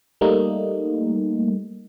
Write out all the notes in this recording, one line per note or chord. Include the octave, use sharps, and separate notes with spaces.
G3 A3 A#3 D#4